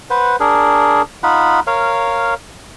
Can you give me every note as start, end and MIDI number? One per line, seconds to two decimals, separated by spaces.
0.10 0.36 71
0.10 0.36 72
0.10 0.36 78
0.40 1.02 62
0.40 1.02 68
0.40 1.02 70
1.23 1.60 63
1.23 1.60 65
1.23 1.60 78
1.23 1.60 83
1.67 2.34 70
1.67 2.34 73
1.67 2.34 77